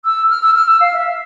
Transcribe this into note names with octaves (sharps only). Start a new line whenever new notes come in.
E6
F6
E6
F6
E6
F5
E5